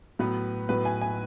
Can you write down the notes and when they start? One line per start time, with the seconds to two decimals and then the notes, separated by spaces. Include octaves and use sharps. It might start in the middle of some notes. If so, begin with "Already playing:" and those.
0.19 A2 F#3 B3 B4
0.69 A2 F#3 B3 B4
0.85 G#5
1.01 G#5